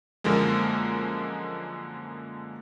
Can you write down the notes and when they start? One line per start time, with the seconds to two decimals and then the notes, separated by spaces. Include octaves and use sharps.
0.24 F#2 D3 F3 G#3 A#3